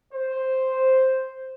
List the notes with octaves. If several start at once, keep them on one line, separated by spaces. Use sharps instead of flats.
C5